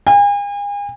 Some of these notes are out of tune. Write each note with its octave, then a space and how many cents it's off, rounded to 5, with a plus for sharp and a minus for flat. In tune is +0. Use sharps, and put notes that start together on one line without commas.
G#5 -40